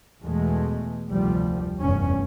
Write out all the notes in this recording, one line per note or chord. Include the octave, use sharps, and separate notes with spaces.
E2 B2 G#3 A3
F1 D2 F3 G3
F1 E2 G2 C#4